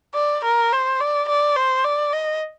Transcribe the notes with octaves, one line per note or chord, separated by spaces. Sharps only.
D5
A#4
C5
D5
D5
C5
D5
D#5